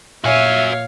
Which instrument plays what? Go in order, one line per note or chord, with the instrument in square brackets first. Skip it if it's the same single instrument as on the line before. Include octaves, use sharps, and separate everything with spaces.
[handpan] A#2 [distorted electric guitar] F#4 G#5 [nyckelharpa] C#5 F5 [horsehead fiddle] E5